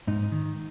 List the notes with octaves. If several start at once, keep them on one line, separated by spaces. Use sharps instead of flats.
G#2 D#4
D#3